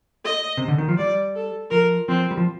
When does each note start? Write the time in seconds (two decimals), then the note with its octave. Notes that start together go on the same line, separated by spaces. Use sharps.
0.25 D#5
0.57 C3
0.68 D3
0.78 D#3
0.88 F3
0.98 G3 D5
1.36 A4
1.71 F3 A#4
2.08 F3 C4
2.31 G3
2.37 F3